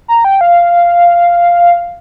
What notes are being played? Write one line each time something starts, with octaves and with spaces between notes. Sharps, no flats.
A#5
G5
F5